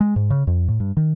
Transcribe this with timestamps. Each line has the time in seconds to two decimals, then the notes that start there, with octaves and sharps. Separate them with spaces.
0.01 G#3
0.16 G#2
0.30 C#3
0.47 F2
0.68 A2
0.80 G2
0.97 D#3